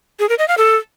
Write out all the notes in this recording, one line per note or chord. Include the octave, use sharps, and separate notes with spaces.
G#4
A#4
D#5
F5
A4